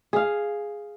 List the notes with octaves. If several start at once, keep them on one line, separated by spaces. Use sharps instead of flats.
G#4 F5